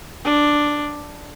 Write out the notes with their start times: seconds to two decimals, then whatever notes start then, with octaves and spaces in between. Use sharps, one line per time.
0.25 D4